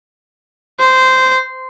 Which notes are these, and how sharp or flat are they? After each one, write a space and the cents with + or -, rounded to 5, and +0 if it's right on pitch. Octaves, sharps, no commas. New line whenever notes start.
C5 -15